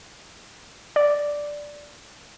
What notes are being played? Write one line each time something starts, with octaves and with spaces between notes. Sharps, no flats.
D5